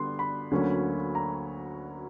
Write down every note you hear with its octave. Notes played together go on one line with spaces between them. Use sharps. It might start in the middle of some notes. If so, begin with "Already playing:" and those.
Already playing: D3 G3 B3 C6
B5
D2 D3 F#3 A#3 C#4
A#5